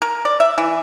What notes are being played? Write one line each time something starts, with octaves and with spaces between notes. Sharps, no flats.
A#4
D5
E5
E3